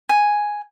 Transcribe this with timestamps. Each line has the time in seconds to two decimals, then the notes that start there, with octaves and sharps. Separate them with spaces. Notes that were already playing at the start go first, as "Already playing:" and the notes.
0.09 G#5